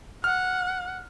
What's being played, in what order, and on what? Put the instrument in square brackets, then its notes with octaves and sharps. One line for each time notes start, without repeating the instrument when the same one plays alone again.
[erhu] F#5 [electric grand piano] F6